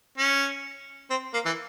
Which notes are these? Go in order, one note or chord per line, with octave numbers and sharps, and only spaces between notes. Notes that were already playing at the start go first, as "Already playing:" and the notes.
C#4
C4
A#3
E3